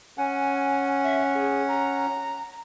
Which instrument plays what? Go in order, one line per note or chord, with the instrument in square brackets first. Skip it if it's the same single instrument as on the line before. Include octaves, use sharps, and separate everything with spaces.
[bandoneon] C#4 F#5 [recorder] G#5
[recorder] E5
G#4
A#5